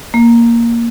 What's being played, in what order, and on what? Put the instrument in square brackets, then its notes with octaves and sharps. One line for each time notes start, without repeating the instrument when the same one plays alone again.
[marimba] A#3